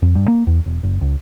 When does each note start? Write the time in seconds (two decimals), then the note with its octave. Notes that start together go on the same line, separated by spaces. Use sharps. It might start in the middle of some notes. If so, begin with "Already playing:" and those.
0.02 F2
0.15 G2
0.28 A#3
0.47 E2
0.66 E1
0.83 F#1
1.01 C#2